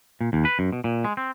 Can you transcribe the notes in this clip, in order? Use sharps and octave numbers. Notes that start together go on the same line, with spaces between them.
A#2
D#2
B4
F#2
B2
A#2
G#3
C4